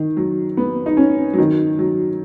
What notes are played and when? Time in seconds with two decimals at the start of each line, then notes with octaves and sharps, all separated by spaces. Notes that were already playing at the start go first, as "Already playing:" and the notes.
Already playing: D#3
0.17 F#3
0.57 B3
0.86 D#4
0.97 C#4
1.33 F#3
1.38 D#3
1.79 F#3